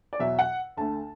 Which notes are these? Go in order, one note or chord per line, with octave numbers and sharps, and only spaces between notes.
D5
E2 B2 F#3 E5
F#5
D2 D3 A3 A5